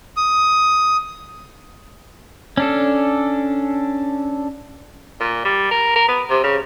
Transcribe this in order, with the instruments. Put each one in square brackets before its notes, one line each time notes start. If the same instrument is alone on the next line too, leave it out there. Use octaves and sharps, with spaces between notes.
[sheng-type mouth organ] D#6
[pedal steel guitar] C#4 D4 A4
[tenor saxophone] A#2
G3
A#4
A#4
B3
C3
C#3